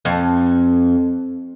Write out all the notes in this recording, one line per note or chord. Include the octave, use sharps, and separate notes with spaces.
F2